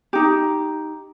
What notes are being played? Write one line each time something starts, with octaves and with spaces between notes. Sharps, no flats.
D#4 G4